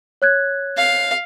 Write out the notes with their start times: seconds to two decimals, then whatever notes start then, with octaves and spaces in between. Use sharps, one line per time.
0.22 C#5 F#6 G#6
0.78 F5